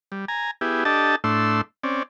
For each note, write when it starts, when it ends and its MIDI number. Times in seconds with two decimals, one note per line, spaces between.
0.12 0.25 55
0.28 0.51 80
0.28 0.51 82
0.61 0.84 59
0.61 0.84 64
0.61 0.84 67
0.61 0.84 68
0.85 1.16 62
0.85 1.16 67
0.85 1.16 69
0.85 1.16 75
0.85 1.16 81
1.24 1.61 45
1.24 1.61 57
1.24 1.61 62
1.24 1.61 84
1.24 1.61 88
1.83 2.03 60
1.83 2.03 61
1.83 2.03 74